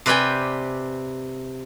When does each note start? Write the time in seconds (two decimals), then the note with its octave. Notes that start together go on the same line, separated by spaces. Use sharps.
0.06 C3 B4 D5 G5 G#5